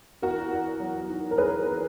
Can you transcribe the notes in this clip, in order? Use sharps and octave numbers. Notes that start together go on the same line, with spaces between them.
E2 F#4 A#4
E2
F#3
D#3
A#4
E2 G#4 B4